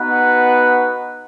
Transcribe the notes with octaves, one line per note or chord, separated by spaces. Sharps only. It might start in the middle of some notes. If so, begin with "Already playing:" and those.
Already playing: B3 D#4 F#4 B4 F#5